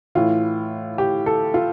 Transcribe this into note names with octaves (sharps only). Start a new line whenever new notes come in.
A2 E3 F4
G4
A4
F4